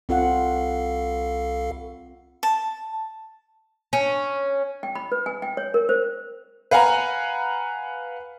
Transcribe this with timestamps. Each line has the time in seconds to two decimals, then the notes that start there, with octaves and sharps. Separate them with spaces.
0.09 C2 C4 F4 A4 F5 F#5
2.43 A5
3.93 C#4
4.83 G5
4.95 B5
5.12 B4
5.26 G#5
5.42 G5
5.57 C#5
5.74 A#4
5.89 C5
6.71 B4 F5 F#5 G#5 A#5